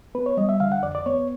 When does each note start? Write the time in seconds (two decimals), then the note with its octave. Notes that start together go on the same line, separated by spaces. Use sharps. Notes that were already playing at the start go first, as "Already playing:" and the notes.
0.15 B3 B4
0.26 C#5
0.37 G3 D#5
0.49 E5
0.60 D3 F5
0.72 F#5
0.83 F2 D5
0.95 D5
1.06 B3 C#5